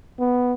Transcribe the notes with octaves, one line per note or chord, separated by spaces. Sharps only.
B3